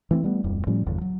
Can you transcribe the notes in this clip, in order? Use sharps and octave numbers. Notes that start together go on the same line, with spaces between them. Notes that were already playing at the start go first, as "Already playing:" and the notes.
E3 A3 B3 C4
G3 A3 B3
D1 F2 G3
A2 F3 G3 C#4
G1 E2 G2 D3
F#3